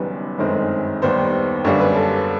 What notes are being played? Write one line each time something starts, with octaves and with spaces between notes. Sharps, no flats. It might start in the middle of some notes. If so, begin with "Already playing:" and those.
Already playing: F#1 F#2 D#3 G3 B3 B4
G1 F#2 D#3 G#3 C4
D#2 D#3 G3 B3 C5
F#2 D3 G3 A#3 C#5
B4
A4